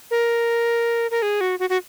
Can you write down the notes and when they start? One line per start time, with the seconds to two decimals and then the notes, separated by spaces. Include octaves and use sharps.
0.11 A#4
1.11 A#4
1.22 G#4
1.41 F#4
1.59 F#4
1.70 F#4